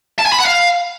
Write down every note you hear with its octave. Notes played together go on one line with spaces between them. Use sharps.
A5
G#5
B5
F#5
F5